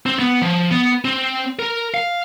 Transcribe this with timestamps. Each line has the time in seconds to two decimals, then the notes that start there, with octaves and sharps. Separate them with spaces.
0.06 C4
0.19 B3
0.42 F3
0.71 B3
1.05 C4
1.59 A#4
1.94 F5